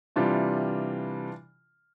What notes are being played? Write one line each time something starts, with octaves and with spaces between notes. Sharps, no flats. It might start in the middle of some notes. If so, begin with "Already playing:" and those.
C3 E3 G3 D4 F4